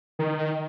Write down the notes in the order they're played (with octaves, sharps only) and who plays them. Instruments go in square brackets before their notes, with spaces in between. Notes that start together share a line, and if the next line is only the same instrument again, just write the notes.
[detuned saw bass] D#3